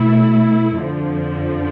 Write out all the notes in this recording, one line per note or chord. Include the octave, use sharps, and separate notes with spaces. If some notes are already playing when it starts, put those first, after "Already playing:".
Already playing: B2 A3 E4
F2 D3 F3